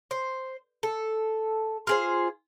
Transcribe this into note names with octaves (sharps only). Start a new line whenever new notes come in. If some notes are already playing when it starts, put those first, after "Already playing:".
C5
A4
F4 G#4 C5